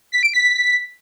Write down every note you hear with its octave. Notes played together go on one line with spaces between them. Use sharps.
B6
D7
B6